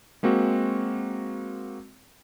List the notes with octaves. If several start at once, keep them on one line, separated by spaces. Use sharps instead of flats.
G#3 A#3 C4 F#4